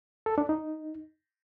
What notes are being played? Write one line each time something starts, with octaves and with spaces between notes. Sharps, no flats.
A4
D4
D#4